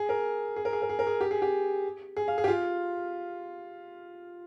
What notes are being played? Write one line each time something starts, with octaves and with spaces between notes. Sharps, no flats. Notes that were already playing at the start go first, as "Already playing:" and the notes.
Already playing: G#4
A#4
G#4
A#4
G#4
A#4
G#4
A#4
G#4
G4
G#4
G4
G#4
F5
G#4
G4
F4